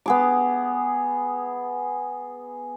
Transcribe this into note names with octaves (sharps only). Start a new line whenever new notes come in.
B3 G#4 D6